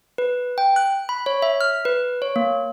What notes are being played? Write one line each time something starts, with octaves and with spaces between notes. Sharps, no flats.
B4
G5
F#6
B5
C#5
E5
F6
B4
C#5
A#3